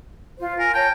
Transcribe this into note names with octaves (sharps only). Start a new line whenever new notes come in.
F4 C5
A#4 G#5
C#5 G5 A5